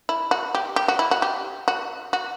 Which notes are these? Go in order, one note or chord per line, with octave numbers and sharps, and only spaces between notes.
E4
F#4
G4
G4
F#4
E4
F#4
G4
F#4
F#4